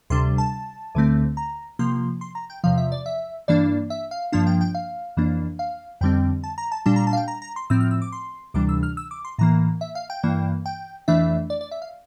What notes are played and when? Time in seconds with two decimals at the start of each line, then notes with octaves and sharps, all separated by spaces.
0.10 D2 C3 G3 D4 C6
0.38 A5
0.95 D2 D3 A3 C4
1.37 A#5
1.79 C3 F3 A#3 C6
2.21 C6
2.35 A#5
2.50 G5
2.64 E2 C3 F3 F5
2.78 E5
2.92 D5
3.06 E5
3.48 G2 E3 A#3 D4 D5
3.90 E5
4.11 F5
4.32 G2 F3 A#3 D4 A5
4.47 G5
4.61 G5
4.75 F5
5.17 F2 E3 A#3 D4
5.59 F5
6.01 F2 D3 G3 C4 G5
6.44 A5
6.58 A#5
6.72 A5
6.86 A#2 G3 D4 A5
6.96 A#5
7.07 A5
7.13 F5
7.17 G5
7.28 A#5
7.42 A#5
7.56 C6
7.70 A2 F3 C4 E6
7.80 F6
7.91 E6
8.02 D6
8.12 C6
8.54 D2 C3 E3 G3 D4 D6
8.69 E6
8.83 F6
8.97 E6
9.11 D6
9.25 C6
9.39 A2 E3 A#3 A#5
9.81 E5
9.95 F5
10.10 G5
10.23 G2 E3 A#3
10.66 G5
11.08 F2 E3 A3 D4 E5
11.50 D5
11.61 D5
11.71 E5
11.82 F5